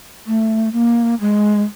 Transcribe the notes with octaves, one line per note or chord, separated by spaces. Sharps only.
A3
A#3
G#3